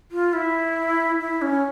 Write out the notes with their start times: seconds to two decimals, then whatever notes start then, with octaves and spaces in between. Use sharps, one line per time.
0.11 F4
0.33 E4
1.20 E4
1.42 C#4